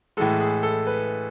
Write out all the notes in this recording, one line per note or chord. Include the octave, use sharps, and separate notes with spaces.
A2 E3 G#3 A4
G#4
A4
B4